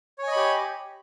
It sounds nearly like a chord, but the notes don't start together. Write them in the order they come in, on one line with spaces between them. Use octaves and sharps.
C#5 G#5 D#5 B5 G4